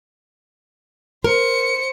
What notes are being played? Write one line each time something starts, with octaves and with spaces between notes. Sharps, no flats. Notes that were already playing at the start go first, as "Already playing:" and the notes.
A#4 C5 C#7